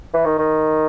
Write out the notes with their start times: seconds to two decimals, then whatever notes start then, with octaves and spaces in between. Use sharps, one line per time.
0.14 E3
0.25 D#3
0.39 D#3